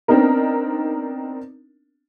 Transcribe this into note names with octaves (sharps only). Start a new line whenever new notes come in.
B3 C4 D4 D#4 A#4